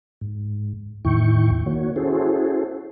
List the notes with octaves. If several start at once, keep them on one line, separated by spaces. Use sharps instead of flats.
G#2
E2 A2 D#3 E4 G5 C#6
D#3 A#3 F#4 C#5
C#4 E4 F#4 G#4 A4 C5